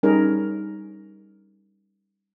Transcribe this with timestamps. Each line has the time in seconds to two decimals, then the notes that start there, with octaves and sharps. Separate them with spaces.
0.03 G3 C#4 D#4 G#4 A#4